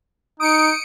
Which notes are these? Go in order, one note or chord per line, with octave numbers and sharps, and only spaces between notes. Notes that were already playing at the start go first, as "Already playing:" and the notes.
D#4 D#6 C#7 D7